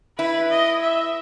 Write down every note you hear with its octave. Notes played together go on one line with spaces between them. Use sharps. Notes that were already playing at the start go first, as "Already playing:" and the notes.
E4 B4
D#5
E5